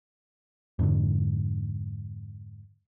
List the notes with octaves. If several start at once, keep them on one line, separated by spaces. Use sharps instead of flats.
F2 G#2 D3